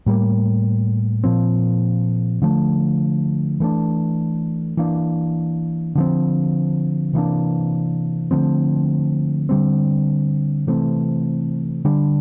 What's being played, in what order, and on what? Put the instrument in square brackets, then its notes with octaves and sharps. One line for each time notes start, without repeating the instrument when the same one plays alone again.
[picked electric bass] A2 G3 A#3
A#2 F3 C4
D3 F3 A3
E3 A3 D4
E3 A#3 D4
D3 F3 C4
C3 E3 A#3 D4
D3 F3 A3 C4
D3 G3 C4
C3 E3 A3 C4
D3 G3 D4